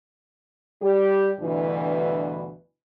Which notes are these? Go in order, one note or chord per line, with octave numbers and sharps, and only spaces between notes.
G3 G4
D2 G2 B2 E3